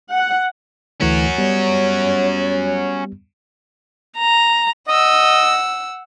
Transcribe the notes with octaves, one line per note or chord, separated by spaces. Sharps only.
F#5
D2 E3 A3 C#4 F#4
G3 B3 C#5
A#5
D#5 F#5 E6